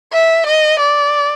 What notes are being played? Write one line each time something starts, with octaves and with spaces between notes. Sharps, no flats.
E5
D#5
D5